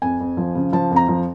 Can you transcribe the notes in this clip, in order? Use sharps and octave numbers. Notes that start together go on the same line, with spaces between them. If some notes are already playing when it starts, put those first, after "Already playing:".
F2 G#5
F2
F3
C#3
F3 A5
F2
A#5
F3